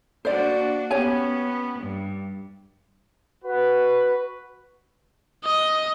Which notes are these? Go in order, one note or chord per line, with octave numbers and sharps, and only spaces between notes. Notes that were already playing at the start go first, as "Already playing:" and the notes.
A#3 D4 F#4 C5 D5
B3 C#4 G4 C#5 G#5
G2
F#4 B4
D#5